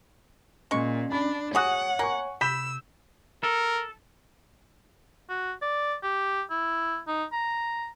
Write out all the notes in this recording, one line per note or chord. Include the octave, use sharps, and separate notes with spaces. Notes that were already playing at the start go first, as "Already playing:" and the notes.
A#2 G#3 C#4 C#6
D4 B5
F#4 G#4 C#5 F#5 C#6 D#6 F#6
A#3 G#5 C#6
C3 B5 E6 G6 B6 E7
A4 A#4
F#4
D5
G4
E4
D#4
A#5